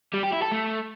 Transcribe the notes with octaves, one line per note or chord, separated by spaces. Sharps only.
G3
G4
E4
A4
A3